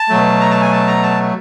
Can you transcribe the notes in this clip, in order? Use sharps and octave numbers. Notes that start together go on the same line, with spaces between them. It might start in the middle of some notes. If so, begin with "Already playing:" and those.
Already playing: A5
B2 F#3 A3
A#5
A5
G#5
A5
A#5
A5